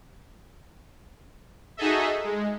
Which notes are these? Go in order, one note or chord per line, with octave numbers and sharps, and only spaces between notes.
D#4 F#4 G#4 A4 D#5 E5
G#3